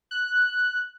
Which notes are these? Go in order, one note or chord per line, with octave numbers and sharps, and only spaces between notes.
F#6